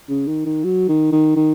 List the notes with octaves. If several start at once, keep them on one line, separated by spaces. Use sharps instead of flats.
C#3
D#3
D#3
F#3
D#3
D#3
D#3